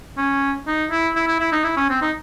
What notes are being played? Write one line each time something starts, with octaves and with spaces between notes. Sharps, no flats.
C#4
D#4
E4
E4
E4
E4
D#4
E4
C#4
C4
D#4